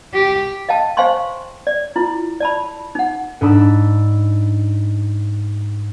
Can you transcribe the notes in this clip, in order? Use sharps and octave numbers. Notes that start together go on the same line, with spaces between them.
G4
D#5 F5 G5 A5
C5 F5 G5 G#5 C6 C#6
D5
E4 F4
D5 A5 B5
D#4 F#5
G#2 D4 B5 E6